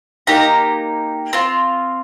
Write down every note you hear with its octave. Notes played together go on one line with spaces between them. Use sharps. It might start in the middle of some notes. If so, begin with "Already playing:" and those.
A#3 D#4 G4 A#5
C4 F4